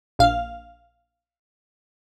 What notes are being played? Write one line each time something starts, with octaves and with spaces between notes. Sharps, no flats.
A#1 F5